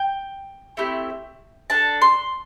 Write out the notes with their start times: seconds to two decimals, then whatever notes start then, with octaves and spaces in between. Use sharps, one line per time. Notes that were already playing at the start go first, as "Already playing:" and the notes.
Already playing: G5
0.77 A3 C4 E4 G4
1.70 D4 A4 A5
2.02 C6